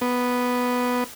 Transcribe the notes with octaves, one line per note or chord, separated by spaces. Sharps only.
B3